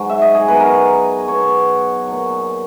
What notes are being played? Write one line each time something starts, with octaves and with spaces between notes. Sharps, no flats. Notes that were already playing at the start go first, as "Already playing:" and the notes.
Already playing: G#2 F#3
E5
D#5
G#4
B2 F#3 B4
A#4
B4
B2 F#3 C#5
A#2 F#3